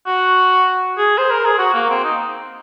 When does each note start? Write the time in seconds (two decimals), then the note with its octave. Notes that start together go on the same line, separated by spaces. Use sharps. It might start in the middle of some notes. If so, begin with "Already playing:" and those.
0.07 F#4
0.98 G#4
1.18 C5
1.31 A#4
1.45 G#4
1.59 F#4
1.74 A#3
1.89 C4
2.04 D#4